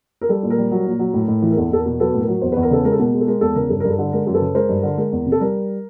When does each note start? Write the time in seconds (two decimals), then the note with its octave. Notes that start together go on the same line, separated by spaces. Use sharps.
0.21 A#4
0.29 G3 A4
0.43 A#2
0.50 A#4
0.58 G3
0.71 F#3
0.86 A#2
0.99 F#3
1.13 A2
1.28 A2
1.42 E3
1.51 A#4
1.56 E2 A4
1.71 E2 A4
1.78 A#4
1.86 B2
1.99 F#3 A4 B4
2.14 A2
2.21 A#4
2.28 F#3
2.42 E2 C5
2.52 E2 B4
2.62 A#4
2.70 C#3 A4 B4
2.84 G#3 A#4
2.92 A4
2.99 B2 A#4
3.13 G#3
3.21 A4
3.27 G#3 A#4
3.41 E2 A4
3.55 C#3 A#4
3.69 G2 A4
3.80 G2 A#4
3.90 A4
3.99 D3
4.12 G#3 A#4
4.27 F#2
4.34 A4 B4
4.41 C#3
4.55 G#3 A#4 C5
4.69 G2
4.83 D3
4.97 G#3 A#4
5.12 E2
5.26 C3
5.32 A4
5.40 G3 A#4